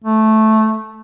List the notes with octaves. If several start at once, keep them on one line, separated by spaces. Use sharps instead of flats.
A3